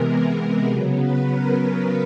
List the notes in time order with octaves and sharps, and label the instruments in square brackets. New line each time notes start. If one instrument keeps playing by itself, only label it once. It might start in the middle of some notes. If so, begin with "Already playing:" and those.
Already playing: [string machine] C3 E3 G#3 B3 A#4
C#3 F#3 B3
B4
A#4
A#4